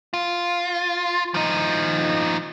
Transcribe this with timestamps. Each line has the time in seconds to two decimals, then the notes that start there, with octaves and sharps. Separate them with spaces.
0.14 F4
1.34 F3 D#4